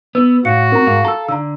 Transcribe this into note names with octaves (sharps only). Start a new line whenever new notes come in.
B3 B4 E6
A2 F#4 F5 C#7
C4 A#4 A#5
G#2 F5
A4 A#5 E6
D3 A#5 E6